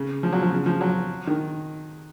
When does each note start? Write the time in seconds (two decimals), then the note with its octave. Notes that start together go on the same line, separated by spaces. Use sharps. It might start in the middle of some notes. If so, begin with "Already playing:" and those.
Already playing: C#3
0.23 F3
0.32 F#3
0.42 F3
0.52 C#3
0.66 F3
0.81 F#3
1.27 D#3